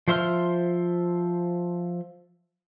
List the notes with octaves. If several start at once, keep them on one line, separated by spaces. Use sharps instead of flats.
F3 C5 E5 C6 F6